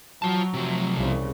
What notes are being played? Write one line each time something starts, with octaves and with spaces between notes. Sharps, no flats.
F#3 F4 A5
C3 F3
C2 C#3